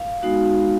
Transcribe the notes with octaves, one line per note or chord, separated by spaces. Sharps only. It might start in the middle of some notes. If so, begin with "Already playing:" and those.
Already playing: F5
G#3 B3 D#4 F#4